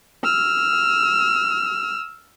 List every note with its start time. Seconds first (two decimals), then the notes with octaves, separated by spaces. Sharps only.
0.24 E6 F6